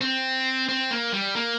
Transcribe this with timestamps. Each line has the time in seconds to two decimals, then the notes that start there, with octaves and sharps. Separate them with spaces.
0.01 C4
0.69 C4
0.91 A#3
1.13 G3
1.36 A#3